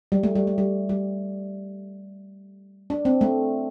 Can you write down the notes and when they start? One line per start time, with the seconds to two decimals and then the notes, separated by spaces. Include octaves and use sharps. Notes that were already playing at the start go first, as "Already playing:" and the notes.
0.12 G3
0.23 A3
0.35 G3
0.47 A3
0.58 G3
0.89 G3
2.90 D4
3.05 C4
3.21 A3